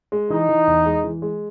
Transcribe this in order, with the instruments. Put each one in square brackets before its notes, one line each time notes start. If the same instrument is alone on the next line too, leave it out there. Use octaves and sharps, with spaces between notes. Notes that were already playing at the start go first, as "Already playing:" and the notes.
[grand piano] G#3
[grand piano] E3 [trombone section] D#4
[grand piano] E3
E2
G#3
E3
G#3